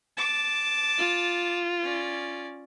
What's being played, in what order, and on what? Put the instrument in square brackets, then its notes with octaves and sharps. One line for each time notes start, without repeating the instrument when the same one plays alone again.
[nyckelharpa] A5 D6
[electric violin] F4
[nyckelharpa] C#4 D5